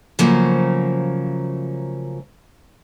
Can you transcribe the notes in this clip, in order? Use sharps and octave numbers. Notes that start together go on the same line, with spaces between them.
C#3 F3 F#3 A3 A#3 C5